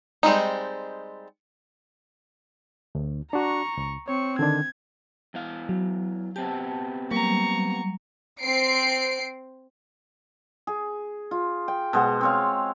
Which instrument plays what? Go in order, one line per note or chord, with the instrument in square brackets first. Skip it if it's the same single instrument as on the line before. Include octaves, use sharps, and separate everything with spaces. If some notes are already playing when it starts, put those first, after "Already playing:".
[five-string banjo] G3 G#3 C4 D#4
[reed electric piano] D2
[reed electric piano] D4 F#4 [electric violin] A#5 C#6
[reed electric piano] C#2
[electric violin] C4 C#6 [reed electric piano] C#5
[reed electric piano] D3 D#3 D4 [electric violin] G#6
[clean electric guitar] E2 E3 F5
[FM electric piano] F#3
[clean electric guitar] B3 C4 G4 [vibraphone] A5
[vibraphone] F#3 G3 [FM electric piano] A#3 [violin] A#5 C#6
[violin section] C4 C7 D7
[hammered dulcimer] G#4
F4
G5
B2 G#3 C5 F#5
C4 C#5 F5